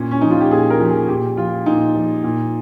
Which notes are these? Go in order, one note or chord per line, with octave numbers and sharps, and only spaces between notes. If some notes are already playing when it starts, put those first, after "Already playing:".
Already playing: A#2 C#4
C#4
F3 D#4
F4
G4
A#2 G#4
A#4
F3
G#4
A#2 G4
F3 F4
A#2 D#4
F3
A#2